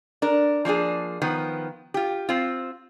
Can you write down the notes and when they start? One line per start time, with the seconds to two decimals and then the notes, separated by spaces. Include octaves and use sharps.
0.22 D4 A#4
0.65 F3 A#3 D4 G#4
1.22 D#3 F3 B3
1.94 F4 G4
2.29 C4 F4